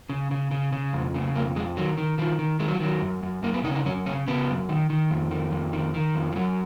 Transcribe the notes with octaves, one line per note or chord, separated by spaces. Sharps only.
C#3
C#3
C#3
C#3
F2
C#3
F2 A#3
F2 G#3
D#3 F#3
D#3
D#3 F3
D#3
D#3 G#3
F#3
F3
D#3 F#3
F#2
F#2
F#2 A#3
B3
C#3 D#4
C#4
D#4
F#2 C#4
C#3 C#4
C#3 B3
F#2
D#3
D#3
F2
D#3
F2
D#3
D#3
F2
F3
F#2 F#3